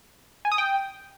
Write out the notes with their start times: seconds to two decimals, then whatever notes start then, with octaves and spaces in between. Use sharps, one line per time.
0.45 G#5
0.52 D#6
0.58 G5